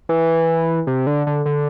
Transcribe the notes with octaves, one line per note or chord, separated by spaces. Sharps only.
E3
C3
D3
D3
D3